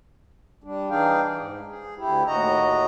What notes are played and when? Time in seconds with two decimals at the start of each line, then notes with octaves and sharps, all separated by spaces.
0.64 G3 D4
0.90 E3 D4 D#4 G#4 F5 G5
1.37 G#2
1.68 G#4
1.97 D2 E4 G4
2.27 D#2 A2 F#4 D#5 A#5